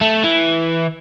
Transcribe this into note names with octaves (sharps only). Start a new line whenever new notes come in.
A3
E3